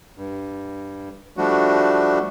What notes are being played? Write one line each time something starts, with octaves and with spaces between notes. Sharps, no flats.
G2
F3 G3 A3 D4 F#4